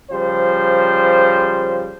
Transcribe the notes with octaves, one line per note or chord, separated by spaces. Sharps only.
C#3 F3 G3 C5